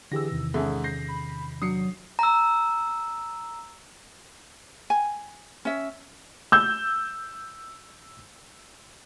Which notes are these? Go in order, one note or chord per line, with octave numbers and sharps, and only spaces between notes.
D3 E3 G4 G#4 E6 A#6
E2 C3 D#3
G#2 C#4 G#4 A4 E5
G6 A#6 C7
B5
F#3 D4 D#6 C7 C#7
A#5 E6
G#5
C#4 E5
E6 G6